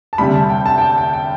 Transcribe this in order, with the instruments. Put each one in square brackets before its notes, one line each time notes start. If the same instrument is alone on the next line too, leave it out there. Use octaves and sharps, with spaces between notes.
[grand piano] A5
[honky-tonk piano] D2 C3 G3 [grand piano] B5
[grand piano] A5
G5
A5
G5
A5
G5
G5